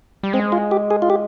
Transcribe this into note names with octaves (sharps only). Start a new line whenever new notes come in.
G3
G#3 C4
F4
G4
G#4
F4
G4